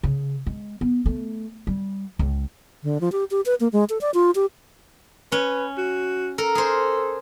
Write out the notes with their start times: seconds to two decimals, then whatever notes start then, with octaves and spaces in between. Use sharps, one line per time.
0.03 C#3
0.47 G#3
0.81 B3
1.06 A3
1.67 G3
2.19 C#2
2.83 D3
3.01 F3
3.12 G4
3.31 G4
3.46 B4
3.60 A#3
3.73 G#3
3.90 A4
4.01 D5
4.14 F4
4.35 G4
5.32 C#4 B4
5.78 F#4
6.38 A4 A#4
6.55 G#4 C5